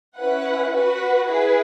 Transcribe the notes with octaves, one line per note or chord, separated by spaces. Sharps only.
C#4 E4 B4 F#5
F#4 B4 F#5
E4 G#4 B4